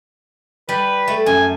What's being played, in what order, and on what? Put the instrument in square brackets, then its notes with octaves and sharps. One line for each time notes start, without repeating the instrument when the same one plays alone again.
[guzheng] G3 [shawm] B4
[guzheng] A3
[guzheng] F#2 [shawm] G#5